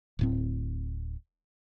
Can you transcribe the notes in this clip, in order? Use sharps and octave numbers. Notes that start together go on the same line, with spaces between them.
D1 A2 C4